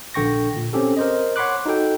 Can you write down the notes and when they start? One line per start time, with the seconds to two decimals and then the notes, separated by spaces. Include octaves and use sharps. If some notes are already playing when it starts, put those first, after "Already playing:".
0.14 A#1 D3 G5 C#6 A#6
0.56 A#2
0.73 C4 C#4 G4 A4
0.97 A#4 C5 D#5
1.36 C#5 F#5 B5 C6 D6 F#6
1.66 D#4 F#4 A4 G5